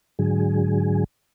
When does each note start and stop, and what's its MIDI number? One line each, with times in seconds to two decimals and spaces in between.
0.19 1.04 44
0.19 1.04 50
0.19 1.04 54
0.19 1.04 68